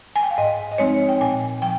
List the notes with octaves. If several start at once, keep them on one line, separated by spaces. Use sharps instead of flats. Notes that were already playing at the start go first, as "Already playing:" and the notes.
G#5
G5
F5
G#2 D#5
D#5
F3 G#3 C4 D#4 C#5
G5
A#2 G#5
F3 G5